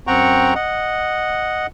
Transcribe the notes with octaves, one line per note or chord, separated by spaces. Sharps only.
F#2 C4 F#5 G5 A#5 C#6
D#5 F#5